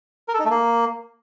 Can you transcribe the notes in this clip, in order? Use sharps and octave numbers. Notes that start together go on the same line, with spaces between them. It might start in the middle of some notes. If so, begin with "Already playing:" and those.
A#4
A4
D#4
A3
A#3